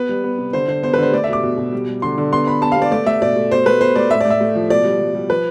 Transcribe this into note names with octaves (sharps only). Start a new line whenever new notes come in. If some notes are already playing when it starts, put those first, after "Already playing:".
Already playing: B3 B4
G3
B3
C3
D3 C5
D3 C5
B3 C5
B4
D3 C5
A3 D5
E5
B2 D6
B2
B2
G3
G3
D3 C6
D3
B3 C6
B3 B5
B3 A5
F5
B3 D5
A3 D5
A3 E5
B2 D5
A3
B2 C5
A3 B4
B2 C5
A3 D5
A2 E5
D5
A2
E5
A3
F3
B2 D5
G3
G3
G3
F3 B4